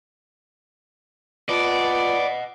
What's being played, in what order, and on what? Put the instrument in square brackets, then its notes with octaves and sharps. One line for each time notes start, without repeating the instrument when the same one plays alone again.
[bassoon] B3 [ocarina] F4 [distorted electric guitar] D5 [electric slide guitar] D#5 F#5 A5